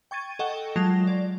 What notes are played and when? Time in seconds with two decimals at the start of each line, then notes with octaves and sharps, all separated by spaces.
0.11 G5 C#6 G#6 A6 D#7
0.39 A4 D#5 F#5 G5 C#6 G7
0.76 F#3 G#3 F4 A5 A#6 F7
1.07 D5